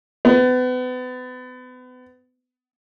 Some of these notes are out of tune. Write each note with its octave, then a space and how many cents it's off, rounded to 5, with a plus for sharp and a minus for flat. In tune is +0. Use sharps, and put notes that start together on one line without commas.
B3 +35